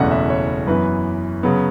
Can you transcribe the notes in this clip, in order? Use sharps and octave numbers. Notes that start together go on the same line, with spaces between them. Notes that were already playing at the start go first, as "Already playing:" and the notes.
Already playing: F#1 E2 B2 A3 C#4 F#5
E5
C#5
F#2 E3 B3 B4
C#3 F#3 B3